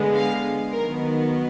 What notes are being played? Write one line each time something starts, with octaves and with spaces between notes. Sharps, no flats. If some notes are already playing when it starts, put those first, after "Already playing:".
Already playing: D3 G#3 B3
F5
D#3 F#3 B3 A#4